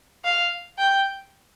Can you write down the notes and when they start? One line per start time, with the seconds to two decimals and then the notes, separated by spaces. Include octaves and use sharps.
0.25 F5
0.78 G5